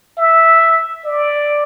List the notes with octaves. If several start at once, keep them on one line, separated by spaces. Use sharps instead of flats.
E5
D5